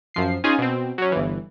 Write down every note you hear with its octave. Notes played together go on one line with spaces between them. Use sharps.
F#2 F3 C7
C#4 D#4 F4 G#4 G#5
B2 C4
F#3 C#4
G1 E3